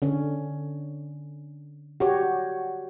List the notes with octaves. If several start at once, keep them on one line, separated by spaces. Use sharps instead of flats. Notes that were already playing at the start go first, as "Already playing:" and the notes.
D3 C#4
F#4 G4 C#5